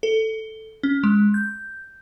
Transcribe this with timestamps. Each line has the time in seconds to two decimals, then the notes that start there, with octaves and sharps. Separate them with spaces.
0.03 A4
0.83 C#4
1.04 G#3
1.34 G6